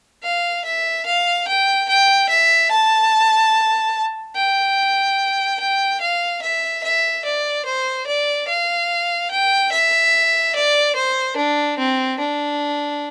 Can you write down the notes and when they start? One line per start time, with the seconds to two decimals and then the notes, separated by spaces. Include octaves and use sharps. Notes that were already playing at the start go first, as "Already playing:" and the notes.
0.23 F5
0.65 E5
1.06 F5
1.48 G5
1.89 G5
2.29 E5
2.71 A5
4.36 G5
5.60 G5
6.01 F5
6.42 E5
6.84 E5
7.25 D5
7.65 C5
8.07 D5
8.48 F5
9.31 G5
9.72 E5
10.55 D5
10.95 C5
11.36 D4
11.78 C4
12.19 D4